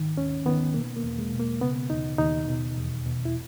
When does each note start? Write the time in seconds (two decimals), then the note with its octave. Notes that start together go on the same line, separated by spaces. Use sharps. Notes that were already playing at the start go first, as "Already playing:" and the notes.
Already playing: G#2 D#3
0.17 D#2 C#4
0.45 D#3 B3
0.74 B2 A#3
0.97 A#3
1.04 E2
1.18 G#3
1.32 B2
1.40 A#3
1.61 C#3 B3
1.90 D#2 D#4
2.18 D#2 D#4
2.48 B2
2.77 E2
3.06 B2
3.25 E4